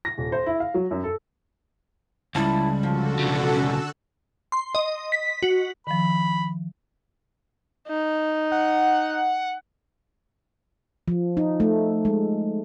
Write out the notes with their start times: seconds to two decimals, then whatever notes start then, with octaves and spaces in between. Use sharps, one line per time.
0.05 A#6
0.18 D#1
0.32 C5
0.46 E4
0.60 F5
0.74 F#3
0.91 F#2
1.04 A4
2.35 C#2 G3 E4 A5
2.83 D3 F3 F#4 A4
3.19 B1 C#3
3.54 C#4 E6 F#6
4.52 C6
4.75 D#5
5.12 B6
5.43 F#4
5.87 D#3 F3 B5
7.89 D#4
8.52 F#5
11.08 F3
11.37 D#4
11.60 A3
12.05 G#3